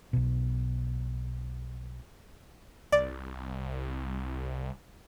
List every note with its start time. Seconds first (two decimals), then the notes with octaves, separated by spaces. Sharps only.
0.13 B1 B2
2.92 C2 D5